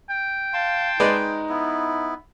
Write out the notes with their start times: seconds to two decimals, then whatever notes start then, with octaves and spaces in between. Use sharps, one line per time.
0.10 G5
0.53 F5 A5 C6
1.00 G#3 D#4 B4 D5
1.49 B3 E4